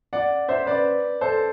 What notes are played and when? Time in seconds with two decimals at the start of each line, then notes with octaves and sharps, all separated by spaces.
0.13 D5 F#5
0.48 C5 E5
0.66 B4 D5
1.21 A4 C5